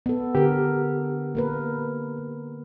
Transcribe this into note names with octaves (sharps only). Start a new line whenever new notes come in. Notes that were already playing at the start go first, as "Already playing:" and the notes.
B3 A4
D3 G4 A#4
A#3 A#4 B4